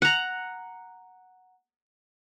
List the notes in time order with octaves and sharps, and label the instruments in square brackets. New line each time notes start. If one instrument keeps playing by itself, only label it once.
[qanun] F#5 A#5